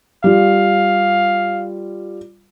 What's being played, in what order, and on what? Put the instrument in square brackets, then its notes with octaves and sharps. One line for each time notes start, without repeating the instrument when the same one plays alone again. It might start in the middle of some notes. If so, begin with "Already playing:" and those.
[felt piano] G3 F4 [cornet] F5